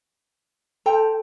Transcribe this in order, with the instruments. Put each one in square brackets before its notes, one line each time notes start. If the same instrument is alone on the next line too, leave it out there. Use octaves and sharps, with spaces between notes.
[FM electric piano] A4 [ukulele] C5 G5 A#5